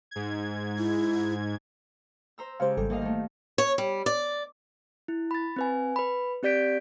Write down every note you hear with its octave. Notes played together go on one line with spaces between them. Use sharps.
G#2 G#6
E4
C5 A#5 E6
C#3 G#3 G4 C5 F5
G#1 G3 A4
D2 A#3 D#5 F5
D#3 A3
C#5
G3
D5
E4
B5 A6
C4 B4 G#5
B4 B5
C4 G4 D5 G6 B6 D7